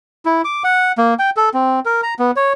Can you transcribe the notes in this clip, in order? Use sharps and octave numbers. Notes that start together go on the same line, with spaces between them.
E4
D6
F#5
A#3
G5
A4
C4
A#4
A#5
B3
C#5